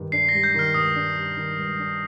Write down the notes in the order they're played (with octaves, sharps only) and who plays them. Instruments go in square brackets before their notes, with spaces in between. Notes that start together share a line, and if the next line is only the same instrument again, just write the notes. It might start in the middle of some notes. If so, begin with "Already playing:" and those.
Already playing: [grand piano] G2 D#3 G3
[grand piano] D4 [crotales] C7
[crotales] A#6
[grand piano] G3
[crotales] G6
[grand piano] D#3 [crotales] F6
[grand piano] G2 [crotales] D#6
[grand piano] D4
G3
D#3
G2
D4